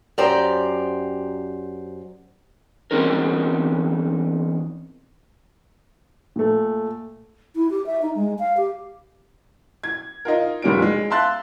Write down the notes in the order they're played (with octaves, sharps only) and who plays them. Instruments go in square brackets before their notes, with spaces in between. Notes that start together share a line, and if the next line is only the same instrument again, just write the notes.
[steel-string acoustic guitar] F#2 G4 C5 D5 A#5
[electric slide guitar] E2 G#3 C4 C#4 D#4 A#4
[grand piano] A#2 A3
[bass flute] E4
G4
E5
D#4
G#3
F5
G4
[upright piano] G#6
D#4 F4 A#4
F1 A#2 G3 C#4 A#4 D7
G#3
E5 F5 A5 C6 F#6 A6